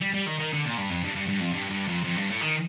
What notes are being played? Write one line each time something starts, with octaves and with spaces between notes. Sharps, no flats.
G3
G3
D#3
D#3
D3
A#2
G2
F2
G2
G2
G2
F2
G2
G2
F2
F2
G2
A2
D#3